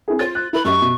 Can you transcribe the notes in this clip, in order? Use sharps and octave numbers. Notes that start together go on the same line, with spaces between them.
C4 E4 G#4
F4 C5 A6
F#6
E4 B4 B5
F#2 G4 D#5 C#6
B2